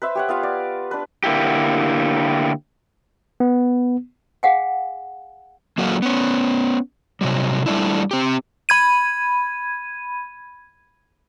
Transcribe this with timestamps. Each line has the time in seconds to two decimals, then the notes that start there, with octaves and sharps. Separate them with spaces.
0.02 B4 C5 E5
0.15 G4 C#5 F#5
0.29 B3 F4 F5
0.43 D5
0.91 D4 B4
1.24 D3 A#3 E4 G4
3.40 B3
4.43 G#4 F5 F#5 G#5
5.78 F#3 A#3 F#4 A4 A#4 F5
6.02 B3 C#4
7.21 C3 F#3 G3
7.66 G3 A3 D4 E4
8.11 C4 G4
8.69 B5 G#6 D#7